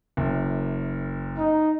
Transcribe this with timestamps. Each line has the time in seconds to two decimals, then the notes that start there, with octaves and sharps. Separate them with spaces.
0.17 F#1 F#2
1.38 D#4